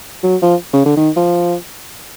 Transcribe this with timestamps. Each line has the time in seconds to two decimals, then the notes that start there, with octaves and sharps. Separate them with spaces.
0.23 F#3
0.42 F3
0.73 C#3
0.86 D3
0.97 D#3
1.16 F3